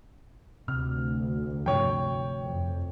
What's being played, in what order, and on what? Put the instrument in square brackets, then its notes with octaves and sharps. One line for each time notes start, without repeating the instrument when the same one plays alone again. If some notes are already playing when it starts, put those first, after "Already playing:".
[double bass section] D2 [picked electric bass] C3 [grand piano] F6
[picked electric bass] G2 C3 F3 [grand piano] C#5 G5
[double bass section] F2